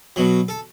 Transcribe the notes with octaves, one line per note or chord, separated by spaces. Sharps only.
B2 F#3
A4